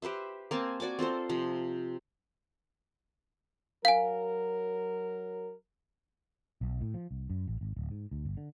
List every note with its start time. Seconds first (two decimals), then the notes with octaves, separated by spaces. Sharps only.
0.02 G4 B4 C5 E5
0.51 A#3 C4 G#5 A5
0.80 F#4 D5 G#5 D6
0.99 C4 F4 A4 C5
1.29 C3 F3
3.85 F#3 A#4 F5 G#5
6.61 B1
6.81 A2
6.94 F3
7.11 C2
7.30 F#2
7.47 A1
7.61 G#1
7.77 D1
7.91 G#2
8.11 D2
8.25 G1
8.37 D3